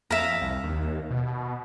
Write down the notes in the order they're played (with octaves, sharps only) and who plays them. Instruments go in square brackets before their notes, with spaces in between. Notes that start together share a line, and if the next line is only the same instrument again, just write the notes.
[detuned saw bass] F2 [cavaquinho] E5 F5 A#5
[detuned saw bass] C2
D#2
B2